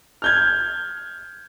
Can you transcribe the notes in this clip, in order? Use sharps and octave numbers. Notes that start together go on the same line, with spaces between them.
F6 G6 G#6